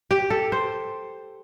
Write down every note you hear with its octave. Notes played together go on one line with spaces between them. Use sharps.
G4
A4
C5